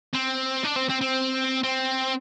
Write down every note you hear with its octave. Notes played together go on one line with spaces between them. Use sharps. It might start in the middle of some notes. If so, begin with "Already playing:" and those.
C4
D4
C4
C4
C4
C4